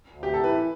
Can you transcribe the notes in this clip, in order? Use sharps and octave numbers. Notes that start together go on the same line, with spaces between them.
D2
C3 G4
E3 A4
B4